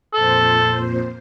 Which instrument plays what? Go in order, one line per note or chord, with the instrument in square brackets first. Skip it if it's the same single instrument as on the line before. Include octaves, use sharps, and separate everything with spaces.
[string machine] F2 A#2 C5 [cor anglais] A4